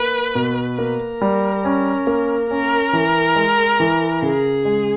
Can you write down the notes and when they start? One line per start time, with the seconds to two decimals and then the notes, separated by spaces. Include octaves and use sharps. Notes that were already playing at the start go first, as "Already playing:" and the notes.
Already playing: A#3 B4
0.35 B2
0.78 A#3 A#4
1.21 G3
1.65 C#4
2.07 A#3
2.50 C#4 A#4
2.93 E3
3.36 G#3
3.80 E3
4.22 C#3 G#4
4.65 G#3